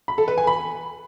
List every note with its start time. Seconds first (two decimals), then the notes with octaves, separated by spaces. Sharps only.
0.08 B5
0.18 A4
0.28 B4
0.38 G#5
0.47 B5